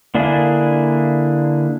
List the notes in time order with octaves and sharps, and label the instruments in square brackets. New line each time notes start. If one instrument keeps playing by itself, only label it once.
[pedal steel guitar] D3 A#3 D4 E4 G#4